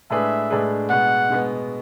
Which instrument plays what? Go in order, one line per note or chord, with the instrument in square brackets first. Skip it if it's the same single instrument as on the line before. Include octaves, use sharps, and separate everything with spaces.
[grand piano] A2 G#3 D4 G#4 B4 [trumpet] E5
[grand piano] A2 G#3 D4 G#4 B4
[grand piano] B2 G#3 B3 [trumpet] F#5
[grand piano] B2 G#3 B3